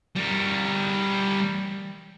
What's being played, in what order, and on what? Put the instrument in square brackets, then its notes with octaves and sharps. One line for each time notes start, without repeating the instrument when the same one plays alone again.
[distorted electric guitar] G3 A#4